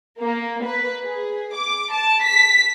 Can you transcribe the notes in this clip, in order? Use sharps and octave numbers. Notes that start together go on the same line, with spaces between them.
A#3
B4
G#4
D6
A5
B6